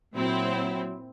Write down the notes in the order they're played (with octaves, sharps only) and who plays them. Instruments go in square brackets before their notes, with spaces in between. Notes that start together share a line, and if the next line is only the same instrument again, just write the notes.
[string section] A#2 C4 E4 [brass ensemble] F#3